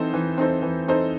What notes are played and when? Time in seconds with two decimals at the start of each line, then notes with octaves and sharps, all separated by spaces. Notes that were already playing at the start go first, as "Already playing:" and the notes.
Already playing: E3 C4 D#4 A4 C5
0.14 E3
0.38 C4 D#4 A4 C5
0.62 E3
0.88 C4 D#4 A4 C5